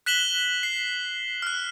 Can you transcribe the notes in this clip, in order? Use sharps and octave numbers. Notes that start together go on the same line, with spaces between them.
F#6 B6 E7 F#7 G7
C7
F6 F#6